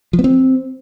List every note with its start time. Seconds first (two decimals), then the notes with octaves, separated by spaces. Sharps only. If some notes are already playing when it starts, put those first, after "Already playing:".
0.13 F3
0.19 B3
0.24 C4